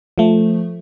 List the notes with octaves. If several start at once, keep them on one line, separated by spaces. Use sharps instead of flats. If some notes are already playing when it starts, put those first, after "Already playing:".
F3 A3